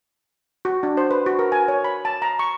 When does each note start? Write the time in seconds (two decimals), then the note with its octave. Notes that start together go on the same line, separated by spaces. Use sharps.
0.65 F#4
0.83 D4
0.97 C5
1.11 B4
1.26 F#4
1.39 A#4
1.52 G#5
1.68 C#5
1.84 B5
2.05 A5
2.22 A#5
2.39 C#6